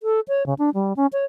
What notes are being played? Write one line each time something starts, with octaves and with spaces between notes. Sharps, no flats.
A4
C#5
C#3
D4
G3
C#4
C#5